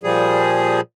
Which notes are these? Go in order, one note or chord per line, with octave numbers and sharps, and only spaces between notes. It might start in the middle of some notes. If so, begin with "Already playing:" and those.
A#2 F3 G3 G#4